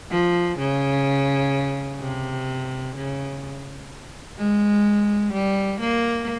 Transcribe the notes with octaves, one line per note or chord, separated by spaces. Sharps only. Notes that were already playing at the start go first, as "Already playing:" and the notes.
F3
C#3
C3
C#3
G#3
G3
A#3